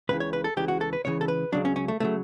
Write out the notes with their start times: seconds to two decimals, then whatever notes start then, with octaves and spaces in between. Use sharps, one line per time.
0.09 C#2 C#3 E3 B4
0.20 C#5
0.33 B4
0.44 A4
0.57 C#2 C#3 E3 G4
0.68 F#4
0.81 A4
0.93 B4
1.04 C#2 C#3 E3 C#5
1.21 A4
1.28 B4
1.52 C#2 C#3 F#3 D4
1.65 C#4
1.76 C#4
1.88 A3
2.00 C#3 F#3 A3